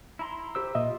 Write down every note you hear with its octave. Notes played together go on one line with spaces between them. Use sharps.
E4 A#5 C6
G4 C5 E6
A#2 F4 D#5 E5